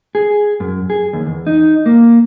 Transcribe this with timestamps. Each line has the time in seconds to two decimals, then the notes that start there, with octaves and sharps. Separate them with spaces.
0.15 G#4
0.60 F#2
0.90 G#4
1.13 D#2
1.26 E2
1.47 D#4
1.86 A#3